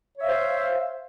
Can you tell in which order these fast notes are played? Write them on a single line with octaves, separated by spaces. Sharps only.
C#5 E5 F5 C5